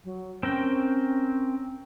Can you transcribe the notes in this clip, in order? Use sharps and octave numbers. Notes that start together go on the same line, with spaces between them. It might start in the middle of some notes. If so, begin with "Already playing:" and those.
F#3
C4 C#4 A#4 G5